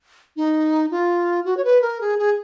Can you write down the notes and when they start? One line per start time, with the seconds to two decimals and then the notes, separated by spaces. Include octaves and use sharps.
0.37 D#4
0.91 F4
1.45 F#4
1.57 C#5
1.65 B4
1.82 A#4
2.01 G#4
2.19 G#4